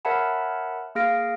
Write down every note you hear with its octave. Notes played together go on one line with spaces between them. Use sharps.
A#4 C#5 E5 F#5 A5 B5
A#3 G#4 F5 F6 A#6 D7